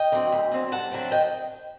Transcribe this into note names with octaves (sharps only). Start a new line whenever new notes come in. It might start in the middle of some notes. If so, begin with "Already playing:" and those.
Already playing: D#5 G5
D3 F#3 C4
D2
D3 F#3 C4
G2 F#5 A5
D3 F#3 A3 C4
D#5 G5